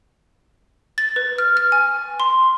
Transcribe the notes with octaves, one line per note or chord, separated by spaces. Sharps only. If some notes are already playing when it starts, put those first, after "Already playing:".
A6
B4
F6
F6
G#5
C6